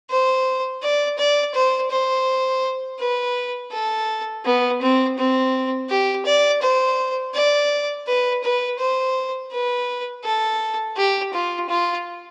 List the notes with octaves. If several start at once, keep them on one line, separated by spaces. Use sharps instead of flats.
C5
D5
D5
C5
C5
B4
A4
B3
C4
C4
G4
D5
C5
D5
B4
B4
C5
B4
A4
G4
F4
F4